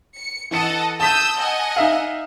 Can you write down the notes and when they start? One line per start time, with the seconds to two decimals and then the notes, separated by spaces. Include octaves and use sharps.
0.16 C#7
0.51 E3 A4 D#5 F#5 C#7
1.00 A5 D#6 E6 G6 B6
1.38 D#5 F#5 G#5
1.76 D#4 E5 F5